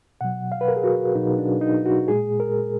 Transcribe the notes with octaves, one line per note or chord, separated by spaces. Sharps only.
B2 F#3 F#5
F5
B4
A#4
G#4
F#4
B2 F#3 D#4
D4
D#4
F#4
A#2 G#3 G#4
A#4